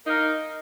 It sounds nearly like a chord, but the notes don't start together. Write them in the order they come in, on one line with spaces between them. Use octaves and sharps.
A#3 D#4 A#4